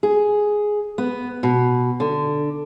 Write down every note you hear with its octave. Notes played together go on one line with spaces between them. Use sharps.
G#4
B3
B2
D3